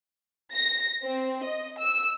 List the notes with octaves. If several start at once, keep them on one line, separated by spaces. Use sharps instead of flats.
A#6
C4
D#5
E6